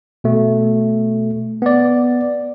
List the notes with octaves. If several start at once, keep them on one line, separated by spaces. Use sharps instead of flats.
B2 A3
B3 D5